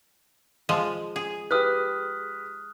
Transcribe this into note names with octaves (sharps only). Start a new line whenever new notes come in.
F3 G#3 D#7
G#4
G4 B4 D#6 F6 F#6